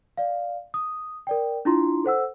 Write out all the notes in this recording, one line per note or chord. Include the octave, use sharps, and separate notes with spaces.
D5 F5
D#6
A#4 D5 G5
D4 E4 F4 A#5 C6
A4 C5 F#5 E6